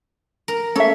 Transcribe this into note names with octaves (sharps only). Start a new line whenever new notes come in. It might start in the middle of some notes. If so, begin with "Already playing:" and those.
A#4
C#4 A4 E5